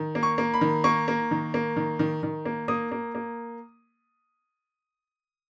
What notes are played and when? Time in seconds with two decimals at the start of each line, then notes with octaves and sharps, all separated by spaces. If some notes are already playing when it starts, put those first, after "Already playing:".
Already playing: D#3
0.15 A#3
0.23 C#6
0.38 A#3
0.54 B5
0.61 D#3
0.84 A#3 C#6
1.08 A#3
1.31 D#3
1.54 A#3
1.76 D#3
1.99 D#3
2.23 D#3
2.45 A#3
2.68 A#3 D#6
2.92 A#3
3.15 A#3